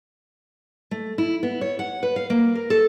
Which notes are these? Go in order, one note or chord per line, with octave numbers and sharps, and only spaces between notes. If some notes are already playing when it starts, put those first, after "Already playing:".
A3
E4
B3
C#5
F#5
B4
F5
A#3
A#4
A4